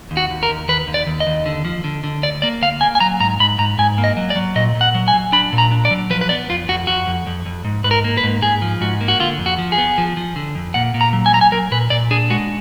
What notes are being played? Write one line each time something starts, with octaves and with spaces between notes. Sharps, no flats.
D#2
F#4
D#2
A#4
D#2
D#2 B4
D#2
D5
D#2
D#5
D#2
D3
F3
D3
D3
D2 D5
A#3 D5
D2 F5
A#3 G#5
G#5
F#3 A#5
G#2 A#5
G#2 B5
G#2 A#5
G#2 G#5
A#3
D#5
F#3
D5
F#3
A#2 D#5
A#2
F#5
F#3
G#5
F#3
D4 B5
A#2
A#5
D4
D5
F#3
F3 B4
B4
B3 D5
F2 F4
F2 F#4
F2 F#4
F2
F2
F2
G#2
G#2 B4
A#4
A#3
B4
G#2
G#2 G#4
F3
G#2 F#4
A#3
F#4
D3 F4
F2
F#4
F3
G#4
B3
F3
F3
D3
F2
A#2 F#5
A#2
A#5
F#3
G#5
F#3 A#5
G#5
F#3 A#4
A#2 B4
A#2 D5
D4 G#4
G#3 F#4